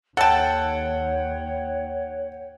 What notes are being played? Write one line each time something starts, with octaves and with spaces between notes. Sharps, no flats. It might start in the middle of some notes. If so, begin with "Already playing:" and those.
D#2 A4 C#5 F#5 G5 A5